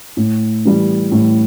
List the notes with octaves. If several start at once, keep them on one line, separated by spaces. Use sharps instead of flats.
A2
E3 G3
A2